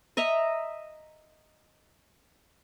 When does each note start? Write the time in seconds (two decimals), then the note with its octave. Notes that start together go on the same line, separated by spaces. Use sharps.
0.17 D#5 E5 A#5